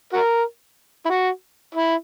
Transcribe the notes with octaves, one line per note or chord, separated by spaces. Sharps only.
F#4 A#4
E4
F#4
E4